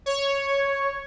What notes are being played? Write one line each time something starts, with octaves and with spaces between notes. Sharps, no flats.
C#5